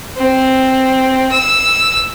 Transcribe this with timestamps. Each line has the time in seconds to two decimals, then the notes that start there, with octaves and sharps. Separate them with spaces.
0.18 C4
1.32 E6